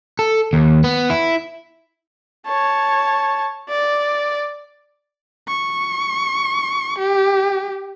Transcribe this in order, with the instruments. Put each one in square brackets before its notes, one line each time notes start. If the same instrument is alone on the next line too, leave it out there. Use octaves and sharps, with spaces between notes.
[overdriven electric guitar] A4
D#2
B3
E4
[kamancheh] C#5 A5
D5
[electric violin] C#6
G4